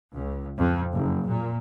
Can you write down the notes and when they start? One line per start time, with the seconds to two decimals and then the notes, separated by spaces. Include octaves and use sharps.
0.13 C#2
0.58 F2
0.93 F#1
1.27 A#2